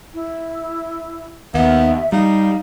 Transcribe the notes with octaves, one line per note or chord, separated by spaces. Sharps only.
E4
D#2 B3 E5
G3 D#4 F5